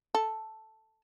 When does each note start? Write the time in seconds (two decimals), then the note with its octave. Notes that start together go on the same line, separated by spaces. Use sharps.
0.15 A4